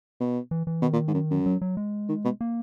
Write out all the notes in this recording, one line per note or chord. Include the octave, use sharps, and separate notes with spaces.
B2
E3
E3
B2 D#3
A#2
G#2
F#2
F#2
F#3
F#3
G#3
D#3
B2
A#3